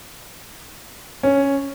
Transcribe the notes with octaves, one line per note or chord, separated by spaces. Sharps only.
C#4